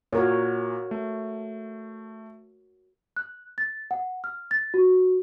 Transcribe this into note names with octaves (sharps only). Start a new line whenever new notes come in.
A#2 F#4 A#4 C#5
A3
F#6
A6
F#5
F6
A6
F#4